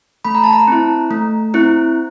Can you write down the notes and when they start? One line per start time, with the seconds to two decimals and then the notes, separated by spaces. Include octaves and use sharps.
0.25 A3 B5
0.35 A#5
0.44 A5
0.53 A#5
0.67 C4 E4
1.11 A3
1.54 C4 E4